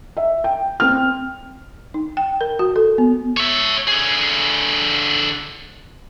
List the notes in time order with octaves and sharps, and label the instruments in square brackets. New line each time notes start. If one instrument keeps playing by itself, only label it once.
[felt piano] E5
G5
C4 F6
[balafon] D#4
G5
A#4
F#4
A4
B3
[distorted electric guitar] C#5 E5
D3 G#4